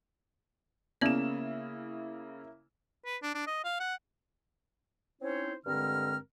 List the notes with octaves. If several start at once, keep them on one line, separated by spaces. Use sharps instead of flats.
C#3 A#3 B3 C#4 E4 D5 E7
B4
D4
D4
D#5
F5
F#5
C4 C#4 D#4 E4 C5 C#5
G2 D3 G#3 C4 A#4 F6